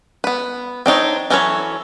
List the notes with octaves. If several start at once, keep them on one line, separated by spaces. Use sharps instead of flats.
B3 B4
C4 D4 D#4 C#5
E3 F#3 C#4 A4 C#5